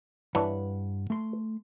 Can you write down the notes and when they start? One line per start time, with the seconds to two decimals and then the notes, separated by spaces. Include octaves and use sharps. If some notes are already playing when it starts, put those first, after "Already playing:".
0.35 G2 E3 D4 C#5 F#5 B5
1.10 A3 C6